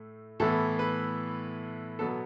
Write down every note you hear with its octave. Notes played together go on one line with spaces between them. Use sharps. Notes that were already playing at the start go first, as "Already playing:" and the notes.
Already playing: A2 A3
A2 E3 B3 A4
B4
B2 F#3 B3 A4